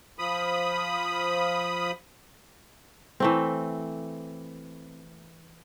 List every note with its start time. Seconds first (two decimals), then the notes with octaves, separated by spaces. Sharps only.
0.19 F3 B5 D#6
3.20 E3 A3 C4